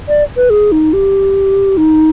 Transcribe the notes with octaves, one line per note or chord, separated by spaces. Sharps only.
D5
B4
G#4
D#4
G4
D#4